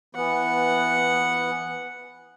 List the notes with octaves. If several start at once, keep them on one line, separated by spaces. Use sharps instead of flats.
E3 B3 F#5